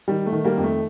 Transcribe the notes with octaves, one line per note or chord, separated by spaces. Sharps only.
D#3 G3
A3
D#3
G3 A#3
F2
A3